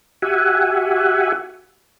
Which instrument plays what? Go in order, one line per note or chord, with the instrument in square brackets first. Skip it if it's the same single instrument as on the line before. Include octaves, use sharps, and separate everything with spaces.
[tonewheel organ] F#4 G4 E5 F#5 G#5